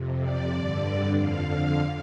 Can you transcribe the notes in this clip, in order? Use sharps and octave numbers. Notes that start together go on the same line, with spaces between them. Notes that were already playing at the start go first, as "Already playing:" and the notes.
Already playing: F2 C3
D5
G2 D3
F2 D3 F5
F5